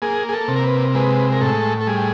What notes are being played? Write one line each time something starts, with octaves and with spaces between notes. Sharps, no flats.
A#3 G#4
G#4
A4
C3
A#4
B4
G#3 B4
A#4
A2 A4
A4
G3 G#4